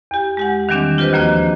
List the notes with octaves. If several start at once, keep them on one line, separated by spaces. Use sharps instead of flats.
E2 G4
G#3 G4 F#5
D#3 E3 G3 C4 D4
F4 G4 B4 C5 D#5
D#2 F3 A#3 D4 F#4 D#5